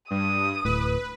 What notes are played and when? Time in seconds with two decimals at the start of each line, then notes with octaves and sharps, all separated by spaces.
0.11 G2 D#6
0.65 D1 A2 B4